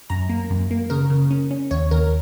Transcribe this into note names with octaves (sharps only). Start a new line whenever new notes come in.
F#2 A#5
A#3
F#2
A#3
C#3 A#4
C#3
C#4
C#4
D#2 C#5
D#2 A#4